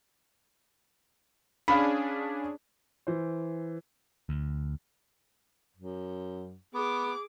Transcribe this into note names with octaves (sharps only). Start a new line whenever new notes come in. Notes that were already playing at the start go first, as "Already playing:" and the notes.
C#4 D4 G#4 F5 B5
E3 C5
D2
F#2
B3 G#4 D6